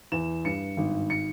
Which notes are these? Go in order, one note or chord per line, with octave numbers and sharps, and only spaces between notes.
E2 E7
G2 C#7
G#1
C#7